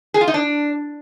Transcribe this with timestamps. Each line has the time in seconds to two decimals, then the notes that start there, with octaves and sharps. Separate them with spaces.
0.14 G#4
0.21 F4
0.27 D#4
0.34 D4